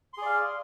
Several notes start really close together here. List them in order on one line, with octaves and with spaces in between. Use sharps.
C6 G#4 D5 F5